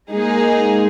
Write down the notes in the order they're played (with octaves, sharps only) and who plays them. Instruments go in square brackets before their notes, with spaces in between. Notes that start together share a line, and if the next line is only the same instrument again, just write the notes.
[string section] G#3 A#3 D#4 G#4